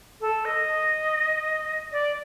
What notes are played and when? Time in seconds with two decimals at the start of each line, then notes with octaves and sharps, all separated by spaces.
0.21 A4
0.45 D#5
1.92 D5